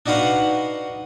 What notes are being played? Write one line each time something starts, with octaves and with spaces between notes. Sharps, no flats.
D4 D#4 F#4 B4 F5 F#5